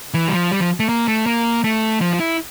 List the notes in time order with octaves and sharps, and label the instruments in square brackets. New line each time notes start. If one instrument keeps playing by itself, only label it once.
[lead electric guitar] E3
G3
F3
G3
F3
A3
A#3
A3
A#3
A3
F3
F4
E4